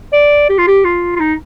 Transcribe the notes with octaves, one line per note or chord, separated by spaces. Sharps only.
D5
G4
F4
G4
F4
F4
D#4